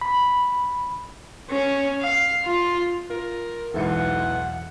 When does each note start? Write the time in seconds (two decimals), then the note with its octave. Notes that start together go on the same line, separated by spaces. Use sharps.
0.01 B5
1.51 C#4
2.01 F5
2.45 F4
3.10 F4 A#4
3.74 B1 E2 G#2 E3 E4 A4 F#5 C#7